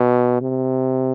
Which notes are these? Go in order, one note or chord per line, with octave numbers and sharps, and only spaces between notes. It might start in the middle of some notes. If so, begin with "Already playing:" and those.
Already playing: B2
C3